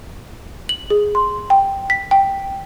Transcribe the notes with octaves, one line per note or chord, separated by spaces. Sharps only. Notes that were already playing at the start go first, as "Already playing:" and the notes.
F#7
G#4
C6
G5
B6
G5